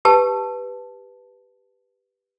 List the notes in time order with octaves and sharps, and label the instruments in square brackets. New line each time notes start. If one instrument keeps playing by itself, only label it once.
[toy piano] G4 B4 A5